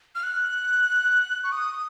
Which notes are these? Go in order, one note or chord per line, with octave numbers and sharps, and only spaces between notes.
F6
F#6
C#6
D#6